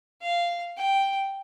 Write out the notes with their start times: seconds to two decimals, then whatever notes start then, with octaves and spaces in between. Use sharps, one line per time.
0.22 F5
0.77 G5